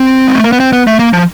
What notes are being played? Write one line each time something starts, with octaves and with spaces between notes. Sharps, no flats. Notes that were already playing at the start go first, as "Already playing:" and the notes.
Already playing: C4
G#3
A3
A#3
B3
C4
B3
A3
A#3
F3